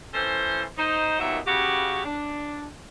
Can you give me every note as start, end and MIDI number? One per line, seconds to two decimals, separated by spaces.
0.13 0.63 52
0.13 0.63 61
0.13 0.63 69
0.13 0.63 72
0.78 1.19 63
0.78 1.19 72
1.19 1.38 39
1.19 1.38 46
1.19 1.38 54
1.19 1.38 59
1.19 1.38 63
1.19 1.38 76
1.47 2.02 49
1.47 2.02 66
1.47 2.02 67
2.05 2.66 62